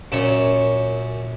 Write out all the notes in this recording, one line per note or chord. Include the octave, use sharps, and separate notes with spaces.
F#2 A#2 C#5 E7